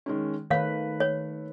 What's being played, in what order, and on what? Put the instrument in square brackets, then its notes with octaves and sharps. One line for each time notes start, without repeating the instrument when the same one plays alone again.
[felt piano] D#3 G#3 C#4
[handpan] D#3 B4 [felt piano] A3 [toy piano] C#5 F5
[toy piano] C#5